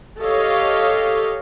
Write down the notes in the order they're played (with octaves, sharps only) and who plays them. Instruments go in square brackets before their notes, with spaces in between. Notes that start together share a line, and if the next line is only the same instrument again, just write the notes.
[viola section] G4 A4 C#5 D#5 F5